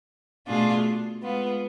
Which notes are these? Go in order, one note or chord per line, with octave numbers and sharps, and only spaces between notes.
B2 A3 D4 F4 G#4
G#3 B3 F4